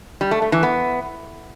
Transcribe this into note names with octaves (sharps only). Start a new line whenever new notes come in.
G3
A3
A3
E3
B3